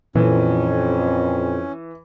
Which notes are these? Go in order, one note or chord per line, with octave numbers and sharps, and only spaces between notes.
F2 A#2 E3 C#4